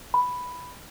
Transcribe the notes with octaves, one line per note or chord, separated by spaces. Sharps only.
B5